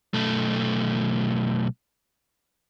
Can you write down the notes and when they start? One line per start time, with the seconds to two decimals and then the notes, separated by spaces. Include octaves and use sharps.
0.14 B1 A3